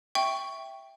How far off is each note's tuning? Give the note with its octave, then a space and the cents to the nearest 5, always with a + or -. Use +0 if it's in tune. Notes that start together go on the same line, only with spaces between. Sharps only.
E5 +0 G5 +0 C#6 +10